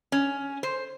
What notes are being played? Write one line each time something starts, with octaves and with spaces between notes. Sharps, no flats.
C#4
C5